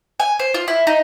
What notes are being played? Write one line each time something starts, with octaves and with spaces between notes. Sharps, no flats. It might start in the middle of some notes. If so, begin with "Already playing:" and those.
G#5
C5
F4
E4
D#4